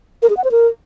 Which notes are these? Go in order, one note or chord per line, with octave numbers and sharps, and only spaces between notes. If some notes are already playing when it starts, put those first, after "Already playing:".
A#4
G#4
F#5
C5
A#4